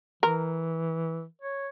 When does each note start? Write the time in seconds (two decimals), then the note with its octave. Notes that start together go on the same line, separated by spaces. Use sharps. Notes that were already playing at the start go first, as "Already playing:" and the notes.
0.23 E3 A#4
1.42 C#5